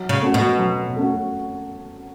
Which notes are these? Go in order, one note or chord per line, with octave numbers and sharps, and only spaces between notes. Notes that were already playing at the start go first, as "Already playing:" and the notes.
Already playing: F#3
C#3
A3 C#4 F#4
B2
F#3
A3 C#4 F#4